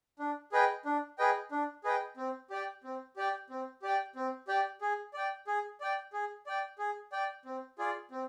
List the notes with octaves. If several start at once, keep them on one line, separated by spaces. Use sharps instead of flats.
D4
G#4 B4 D#5 G5
D4
G#4 B4 D#5 G5
D4
G#4 B4 D#5 G5
C4
G4 D5 G5
C4
G4 D5 G5
C4
G4 D5 G5
C4
G4 D5 G5
G#4
D5 G5
G#4
D5 G5
G#4
D5 G5
G#4
D5 G5
C4
F4 G#4 D5
C4